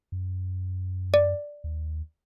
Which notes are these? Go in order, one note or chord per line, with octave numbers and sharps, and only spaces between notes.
F#2
D5
D#2